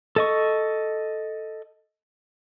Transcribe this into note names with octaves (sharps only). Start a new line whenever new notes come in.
A4 D#5 C#6